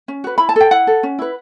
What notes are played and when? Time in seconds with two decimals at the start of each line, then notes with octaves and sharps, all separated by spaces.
0.08 C#4
0.24 F#4 B4
0.38 E4 B5
0.49 A5
0.56 A4 G5
0.71 E4 F#5
0.87 A4
1.03 C#4
1.19 E4 B4